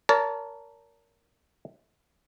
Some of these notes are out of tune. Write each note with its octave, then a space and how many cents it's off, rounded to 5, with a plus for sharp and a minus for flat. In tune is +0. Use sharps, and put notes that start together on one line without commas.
A#4 +0 C#5 +45 A5 +0